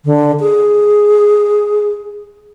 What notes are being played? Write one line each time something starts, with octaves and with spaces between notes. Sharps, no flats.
D3
G#4